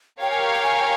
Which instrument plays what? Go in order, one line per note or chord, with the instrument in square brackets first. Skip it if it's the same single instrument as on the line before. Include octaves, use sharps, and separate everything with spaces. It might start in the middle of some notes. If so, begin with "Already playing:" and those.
[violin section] G4 A#4 C#5 F5 [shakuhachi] G5
[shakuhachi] G#5
G5
G5
G#5